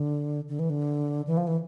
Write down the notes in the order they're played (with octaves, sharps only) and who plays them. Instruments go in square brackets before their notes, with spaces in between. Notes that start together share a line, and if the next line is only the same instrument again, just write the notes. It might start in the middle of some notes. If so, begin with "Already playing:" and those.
Already playing: [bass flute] D3
D3
E3
D3
E3
F3
E3